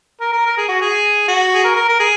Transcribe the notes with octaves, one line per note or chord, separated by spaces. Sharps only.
A#4
A#4
A#4
G#4
F#4
G#4
F#4
G#4
A#4
A#4
A#4
G#4